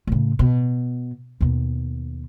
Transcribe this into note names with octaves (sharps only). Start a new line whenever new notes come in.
A2 C#3
B2
D#2 B2